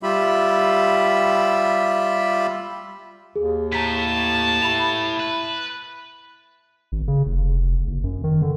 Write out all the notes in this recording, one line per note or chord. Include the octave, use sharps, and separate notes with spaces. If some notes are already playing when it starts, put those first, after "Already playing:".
G3 F4 G4 E5 B5
D#2 G#4
A2 A5 A#5 B6
E4 B5 F7
B4
G#1
C#3
F1
F#1
F#2
D#3
D3